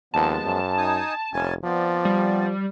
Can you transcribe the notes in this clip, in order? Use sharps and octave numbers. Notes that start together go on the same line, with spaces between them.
D#2 F3 G#3 B3 A5
F#2
D#4 G#5 D#6
F1 C#4 G#5 A5
F3 B3 C4 D5
G3